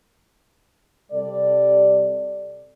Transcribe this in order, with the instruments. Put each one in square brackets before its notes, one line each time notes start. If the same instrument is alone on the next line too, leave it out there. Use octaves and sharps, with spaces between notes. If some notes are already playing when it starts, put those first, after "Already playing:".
[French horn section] C3 G3 A4 D5